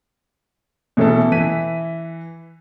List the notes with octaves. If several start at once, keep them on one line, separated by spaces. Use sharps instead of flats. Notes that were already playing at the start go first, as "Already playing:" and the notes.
B2 E3 A3 C#4 A4
E3 B6 D#7